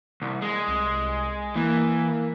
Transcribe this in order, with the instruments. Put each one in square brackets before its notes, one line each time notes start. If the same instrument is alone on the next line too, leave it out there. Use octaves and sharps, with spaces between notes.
[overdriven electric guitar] C2
G#3
[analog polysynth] C2
[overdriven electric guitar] E3 [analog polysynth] A#3